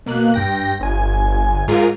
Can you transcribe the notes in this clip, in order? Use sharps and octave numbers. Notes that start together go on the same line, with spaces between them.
B2 A#3 F#6
G2 G5 A#6
G1 G#5
G#2 F4 G#4 A#4